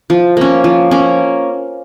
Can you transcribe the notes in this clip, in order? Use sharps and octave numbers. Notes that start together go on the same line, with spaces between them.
F3
A#3 C#4
F3
A#3 C#4